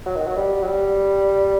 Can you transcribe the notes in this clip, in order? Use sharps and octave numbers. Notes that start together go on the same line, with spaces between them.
F#3
D#3
F#3
G3
F#3
G3